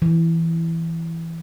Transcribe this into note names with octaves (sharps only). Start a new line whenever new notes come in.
E3